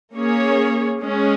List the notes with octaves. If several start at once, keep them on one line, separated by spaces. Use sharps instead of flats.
A#3 C#4 G#4 C#5
G#3 C#4 G#4